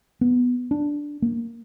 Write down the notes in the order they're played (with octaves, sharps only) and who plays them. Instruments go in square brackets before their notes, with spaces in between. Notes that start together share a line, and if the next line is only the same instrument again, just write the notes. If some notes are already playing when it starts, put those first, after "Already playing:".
[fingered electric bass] B3
D4
A#3